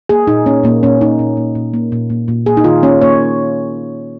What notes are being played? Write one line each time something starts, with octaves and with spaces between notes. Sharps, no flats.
A#3 G#4
A#2 D#4
A#3 C#4
A#2 A#3
A#2 C#4
A#2 D#4
A#2
A#2
A#2
A#3
A#2
A#2
A#2
A#3 G#4
D#4
D#3 F4
A#3 C#4
A#3 C#5